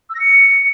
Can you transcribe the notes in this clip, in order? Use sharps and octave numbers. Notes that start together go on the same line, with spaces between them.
E6
A#6
C#7